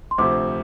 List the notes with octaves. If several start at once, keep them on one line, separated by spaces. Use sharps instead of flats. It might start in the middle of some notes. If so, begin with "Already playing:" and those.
C6
D2 C3 F3 C4 D6